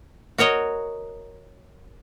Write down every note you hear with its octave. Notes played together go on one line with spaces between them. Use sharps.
F#4 A#4 C#5 D#5